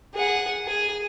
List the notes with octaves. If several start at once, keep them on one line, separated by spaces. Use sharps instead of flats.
G#4 F#5
G#4